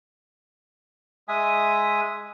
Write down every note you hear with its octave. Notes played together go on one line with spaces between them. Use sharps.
G#3 E5 G#5 D#6